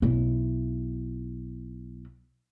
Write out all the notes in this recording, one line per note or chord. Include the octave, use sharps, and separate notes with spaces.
B1 E4